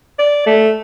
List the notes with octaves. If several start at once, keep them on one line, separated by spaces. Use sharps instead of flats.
D5
A3